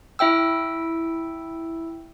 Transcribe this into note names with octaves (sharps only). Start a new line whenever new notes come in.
E4 E5 G5 E6